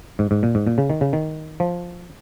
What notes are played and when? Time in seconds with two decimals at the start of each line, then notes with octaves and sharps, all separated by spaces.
0.19 G#2
0.31 G#2
0.43 A#2
0.55 G#2
0.67 A#2
0.78 C#3
0.90 D#3
1.01 C#3
1.13 D#3
1.60 F3